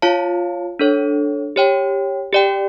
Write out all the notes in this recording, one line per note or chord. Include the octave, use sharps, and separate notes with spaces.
F4 C#5 F5 A5
D4 A4 C#5
G4 C#5 G5
G4 D5 G5